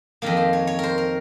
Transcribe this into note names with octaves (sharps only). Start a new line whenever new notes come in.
F2 D#3 A#3 A#4
C5
C#5
C#5
A#4 C5
A#4